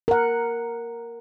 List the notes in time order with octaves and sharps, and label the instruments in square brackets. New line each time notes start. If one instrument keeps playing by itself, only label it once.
[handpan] A#4 F#5